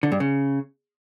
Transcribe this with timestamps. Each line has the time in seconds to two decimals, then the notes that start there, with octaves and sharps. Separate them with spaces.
0.03 D3
0.12 G2
0.20 C#3